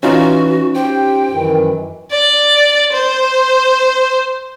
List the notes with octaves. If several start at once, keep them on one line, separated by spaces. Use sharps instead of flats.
E3 C#4 D#4 F4 F#4
G4 C5 G5
F#2 D#3 E3
D5
C5